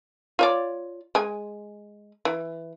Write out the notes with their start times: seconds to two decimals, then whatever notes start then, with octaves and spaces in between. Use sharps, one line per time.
0.39 F4 C#5 D5
1.15 G#3 G#5
2.25 E3